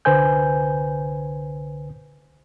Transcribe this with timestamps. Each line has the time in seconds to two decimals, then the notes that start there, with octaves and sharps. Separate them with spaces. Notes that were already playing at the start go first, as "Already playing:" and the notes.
0.05 C2 D3 B4 C5 G#5 G6